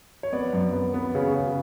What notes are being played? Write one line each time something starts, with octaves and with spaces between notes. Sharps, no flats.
C#5
B3 D5
F#2
B3
B3
C#3
C#3